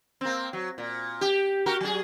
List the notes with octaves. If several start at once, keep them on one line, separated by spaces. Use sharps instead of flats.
A#3 C4
F#3
A#2
G4
F#4 G4 A#4
F#3 G#4